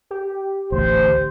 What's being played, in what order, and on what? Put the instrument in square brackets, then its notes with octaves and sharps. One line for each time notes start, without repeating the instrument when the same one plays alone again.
[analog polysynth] G4
[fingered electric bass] A1 D2 [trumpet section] C5